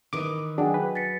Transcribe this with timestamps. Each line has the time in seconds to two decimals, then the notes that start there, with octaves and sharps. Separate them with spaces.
0.13 D#3 E3 D6 D#6
0.58 F#3 D4 F#4 G#4 F#5 G5
0.74 B4
0.95 A6 B6 C#7